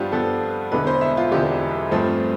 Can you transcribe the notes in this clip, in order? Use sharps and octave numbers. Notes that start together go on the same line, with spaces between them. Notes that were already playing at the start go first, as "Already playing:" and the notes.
Already playing: G2 F3 B3 D4 F4 G4
G2 F3 B3 A4
E1 E2 D3 B4
C5
E5
F4
E1 E2 D3 G4
G2 F3 A3 C4